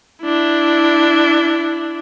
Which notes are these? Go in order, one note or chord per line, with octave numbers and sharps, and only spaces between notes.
D4 E4